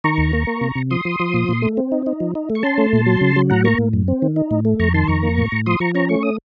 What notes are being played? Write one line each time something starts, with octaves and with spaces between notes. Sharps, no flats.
D#3 A#5 C#6
D#2
A#3
A#3
C3
C3
F3 C6 D#6
F3
F3
A#2
A#2
A3
C4
D#4
D#4
F3
D#4
A3
C#6
C#4 A5 C6
A3
A#2
F#3
C#3
F#3
A2 F#5 A#5
A#3 A#5 C#6
A2
F#2
C4
D#3
D#4
A2
A3
F2 A#5 C#6
D#3 A5 C6
F2 A#5 C#6
A#3
A2
A2
F3 C6 D#6
F3 A#5 C#6
C#4 A#5 C#6
A3 C#6
D#6